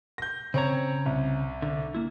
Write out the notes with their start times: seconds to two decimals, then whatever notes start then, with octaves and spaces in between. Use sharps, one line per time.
0.18 G6 A#6
0.54 C#3 C4 C#5 A#5 G#6
1.06 C2
1.62 D3
1.95 A#3 E4